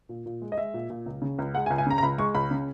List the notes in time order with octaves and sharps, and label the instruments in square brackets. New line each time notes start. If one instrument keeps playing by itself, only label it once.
[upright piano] A#2
A#2
G#3
D#5
G#3 E5
A#2
A#2
C#2
C#3
C#2
G#3 F#5
G#5
C#2
G#5
C#3 A#5
A#5
C#2 B5
G#3 C#6
C#2 B5
C#3